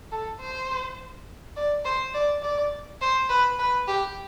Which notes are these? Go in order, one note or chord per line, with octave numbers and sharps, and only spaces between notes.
A4
C5
D5
C5
D5
D5
C5
B4
B4
G4